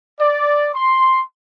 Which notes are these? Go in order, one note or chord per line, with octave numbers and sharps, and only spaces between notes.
D5
C6